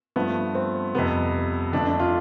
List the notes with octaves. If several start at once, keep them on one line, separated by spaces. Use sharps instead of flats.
G2 F3 A3 B3
C4
F2 C3 G3 B3
F2 D3 A3 D4
D4
F4